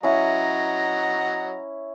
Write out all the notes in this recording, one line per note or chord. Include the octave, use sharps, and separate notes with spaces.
F#3 C#4 E4 D#5 F#5 A#5